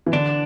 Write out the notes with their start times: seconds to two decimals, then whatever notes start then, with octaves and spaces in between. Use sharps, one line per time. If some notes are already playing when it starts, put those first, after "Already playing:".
0.06 E3
0.13 D3 D4